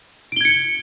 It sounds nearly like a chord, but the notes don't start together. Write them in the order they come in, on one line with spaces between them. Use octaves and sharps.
D7 G7 G#6 C#7